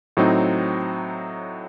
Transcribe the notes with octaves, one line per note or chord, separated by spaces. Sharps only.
A2 F#3 C4 D#4